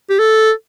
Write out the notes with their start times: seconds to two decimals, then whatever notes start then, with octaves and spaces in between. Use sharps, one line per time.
0.10 G4
0.19 A4